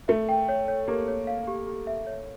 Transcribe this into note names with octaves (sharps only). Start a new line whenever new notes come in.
A3 E5
G5
C#5
C#5
A#3 G4
C#5
F5
G4
G4
E5
C#5